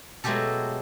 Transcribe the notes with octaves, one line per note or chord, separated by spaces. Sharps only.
B2 F#3 G#3 A3 G4 A4